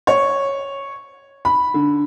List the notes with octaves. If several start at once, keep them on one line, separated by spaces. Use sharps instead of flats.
C#5
B5
D3